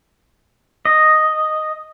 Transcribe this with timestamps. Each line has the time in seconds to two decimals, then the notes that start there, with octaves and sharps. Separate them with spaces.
0.85 D#5